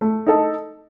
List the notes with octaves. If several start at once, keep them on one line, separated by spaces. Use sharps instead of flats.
A3
D#4 A4